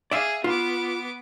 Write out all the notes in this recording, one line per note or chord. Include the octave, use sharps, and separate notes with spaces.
G#4 D5 E5 F5
B3 F4 D6